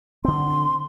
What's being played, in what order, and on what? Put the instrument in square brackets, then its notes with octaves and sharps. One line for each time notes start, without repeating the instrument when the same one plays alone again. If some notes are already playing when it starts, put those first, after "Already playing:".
[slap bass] D3 C4 [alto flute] C6